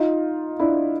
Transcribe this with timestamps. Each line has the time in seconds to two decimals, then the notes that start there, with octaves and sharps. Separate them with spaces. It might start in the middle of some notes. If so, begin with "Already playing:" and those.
Already playing: D#4 F4
0.59 D4 E4